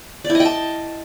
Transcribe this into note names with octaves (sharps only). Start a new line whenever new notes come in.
D5
E4
D#5
G5
A5